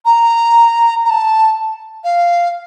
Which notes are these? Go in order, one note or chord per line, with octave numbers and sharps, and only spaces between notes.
A#5
A#5
A5
F5